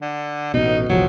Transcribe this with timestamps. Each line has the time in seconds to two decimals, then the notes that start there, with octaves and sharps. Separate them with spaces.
0.02 D3
0.54 A1 B2 D#4
0.89 D#1 C2 F3 F#3